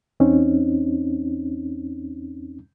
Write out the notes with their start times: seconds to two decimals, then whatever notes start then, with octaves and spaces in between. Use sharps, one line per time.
0.20 E2 C4 C#4 D#4